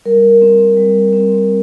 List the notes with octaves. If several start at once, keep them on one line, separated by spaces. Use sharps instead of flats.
G3 A#4
C4
G3
C4